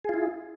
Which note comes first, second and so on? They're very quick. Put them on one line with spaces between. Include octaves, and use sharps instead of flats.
G#4 F4 E4